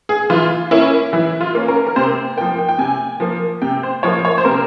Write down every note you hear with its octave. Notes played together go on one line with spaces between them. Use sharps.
G#4
E3 F4
A#3 C#4 E4
E3 E4
F4
A#3 C#4
A#4
A#4
C3 C5
F3 A#3 G5
G5
G5
C3 G#5
F3 A#3
C3 G5
C5
F3 A#3 C#5
C#5
C5
C3 A#4